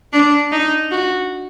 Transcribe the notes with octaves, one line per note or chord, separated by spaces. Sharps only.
D4
D#4
F#4